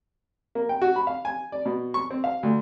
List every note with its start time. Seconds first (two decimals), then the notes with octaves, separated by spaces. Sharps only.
0.55 A#3
0.69 G5
0.82 F#4
0.96 B5
1.07 F5
1.25 G#5
1.52 D5
1.65 B2
1.94 C#6
2.11 C4
2.24 F5
2.43 D2